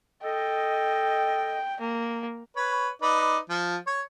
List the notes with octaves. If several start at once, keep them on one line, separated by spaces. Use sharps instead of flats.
A4 D#5 G5
A#3
B4 C#5
D#4 B4 D5
F3
C#5